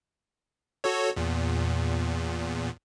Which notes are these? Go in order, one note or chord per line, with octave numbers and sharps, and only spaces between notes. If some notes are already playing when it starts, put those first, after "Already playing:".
F#4 A4 C#5
E2 A#2